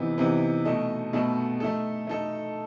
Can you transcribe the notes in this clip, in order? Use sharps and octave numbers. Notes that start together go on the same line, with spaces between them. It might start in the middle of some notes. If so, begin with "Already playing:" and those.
Already playing: C3 E3 B3 D#4
C3 E3 B3 D#4
B2 A3 D#4 A4 D#5
B2 A3 D#4 A4 D#5
A3 D#4 A4
A3 D#4 A4